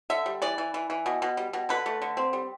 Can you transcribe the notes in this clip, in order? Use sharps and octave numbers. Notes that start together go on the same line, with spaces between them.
D3 E5
G3
E3 D5
E3
E3
E3
B2
B2
G3
B2
D3 B4
A3
D3
C4
G3